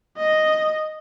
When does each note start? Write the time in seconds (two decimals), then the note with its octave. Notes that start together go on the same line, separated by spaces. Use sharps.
0.17 D#5